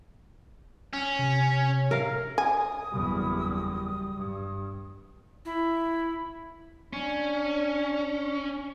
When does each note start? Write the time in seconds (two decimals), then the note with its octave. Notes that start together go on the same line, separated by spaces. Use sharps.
0.93 C#4
1.19 C3
1.91 A#4 F5
2.38 G#5 D#6
2.92 F#1 E2 G3
4.16 G2
5.45 E4
6.93 C#4 D4